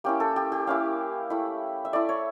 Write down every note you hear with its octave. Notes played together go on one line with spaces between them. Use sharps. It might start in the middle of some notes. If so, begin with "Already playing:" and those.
A#3 C#4 E4 G4
A4
G4
G4
A#3 C#4 E4 F5
A3 E4
E5
A3 E4 D5
C#5